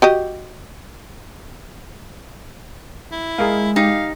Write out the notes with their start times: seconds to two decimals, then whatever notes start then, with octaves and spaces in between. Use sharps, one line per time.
0.02 F#4 G4 D#5
3.12 E4
3.38 G#3 G#4 A#4 F5
3.76 D#4 G4 F5